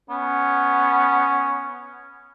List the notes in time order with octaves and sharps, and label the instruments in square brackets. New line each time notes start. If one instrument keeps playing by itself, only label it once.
[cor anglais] B3 [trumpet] C#4